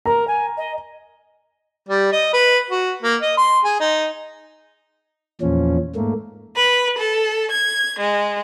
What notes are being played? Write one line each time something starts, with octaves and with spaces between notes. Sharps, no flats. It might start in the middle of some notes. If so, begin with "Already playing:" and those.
A#4 A#5
G#5
D#5
G3
D#5
B4
F#4
A#3
D#5
C6
G#4
D#4
E2 A#2 F3 C#4
G#2 A3 A#3
B4
A4
G#6
G#3